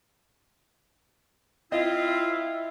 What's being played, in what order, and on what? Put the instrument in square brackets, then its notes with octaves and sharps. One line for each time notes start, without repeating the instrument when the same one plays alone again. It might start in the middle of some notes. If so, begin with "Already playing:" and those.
[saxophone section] C4 F4 [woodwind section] E4 [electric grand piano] D#5